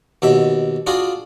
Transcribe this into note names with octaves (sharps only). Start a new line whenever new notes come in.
D#2 B2 E5
D4 F4 F#4 G#4